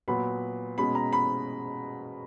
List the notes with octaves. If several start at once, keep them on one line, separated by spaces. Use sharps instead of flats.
A#2 F#3 B3 B5
B2 G#3 C#4 B5
A#5
B5